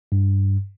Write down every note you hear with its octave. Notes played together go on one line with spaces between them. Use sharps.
G2